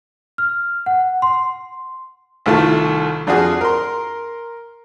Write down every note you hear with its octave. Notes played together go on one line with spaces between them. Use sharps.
F6
F#5
C6
C2 A2 D#3 A3 F4 A5
F2 D4 F4 F#4 G#4
A#4 C6